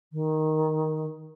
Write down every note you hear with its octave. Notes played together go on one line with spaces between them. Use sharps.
D#3